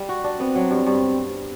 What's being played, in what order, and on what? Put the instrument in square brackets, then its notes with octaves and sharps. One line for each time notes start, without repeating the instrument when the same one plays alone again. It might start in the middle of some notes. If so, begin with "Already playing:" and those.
Already playing: [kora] G3
F#4
D4
[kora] B3 [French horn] C4
[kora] F#3
G2
G2